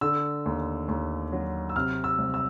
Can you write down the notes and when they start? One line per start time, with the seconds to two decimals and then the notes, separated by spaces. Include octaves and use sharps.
0.01 D3 E6
0.46 D#2
0.88 D#2
1.32 F#3
1.70 E6
1.76 C3 F6
2.04 E6
2.18 C2
2.34 E6